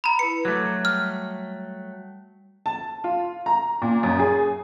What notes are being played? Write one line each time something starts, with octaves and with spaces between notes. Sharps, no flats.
A#5 B5
E4 B4 C#7
F#3 A3 D6
G3 F6
A5
F4
A#5
A#2
F#2
G#4